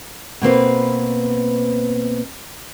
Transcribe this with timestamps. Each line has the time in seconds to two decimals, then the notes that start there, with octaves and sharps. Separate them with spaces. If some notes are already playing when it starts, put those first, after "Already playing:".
0.42 B2 A#3 C4 B4